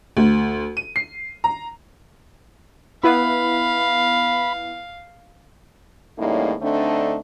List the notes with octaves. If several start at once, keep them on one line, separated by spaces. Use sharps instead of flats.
D2
D#7
C7
A#5
B3 E4 B4 F5 B5
E2 A2 G3 A#3 C#4 D#4
D3 A3 C4 D4 D#4 A4